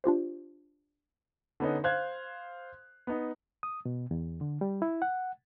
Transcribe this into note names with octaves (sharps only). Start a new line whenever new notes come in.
D4 F4 G4 C5
D3 B3 C#4 D#4
C5 F5 F#6 G#6
B3 D#4
D#6
B2
E2
D3
G3
E4
F#5